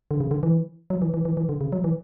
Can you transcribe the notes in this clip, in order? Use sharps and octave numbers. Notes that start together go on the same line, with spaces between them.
D3
C#3
D3
E3
F#3
E3
E3
E3
E3
D3
C#3
F#3
E3